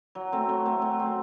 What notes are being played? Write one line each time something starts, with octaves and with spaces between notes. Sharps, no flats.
F#3
A3 C4
F#3
A3 C4
F#3
A3 C4